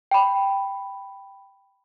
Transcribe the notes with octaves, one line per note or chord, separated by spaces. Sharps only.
G5 B5